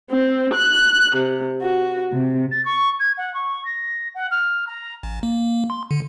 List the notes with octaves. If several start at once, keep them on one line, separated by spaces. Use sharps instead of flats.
C4
F#6
C3
F#4
C3
A6
C#6
G#6
F#5
C#6
A#6
F#5
F6
A#5
A1
A#3
C6
D3